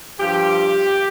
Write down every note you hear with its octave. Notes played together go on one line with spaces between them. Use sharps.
G2 F3 G4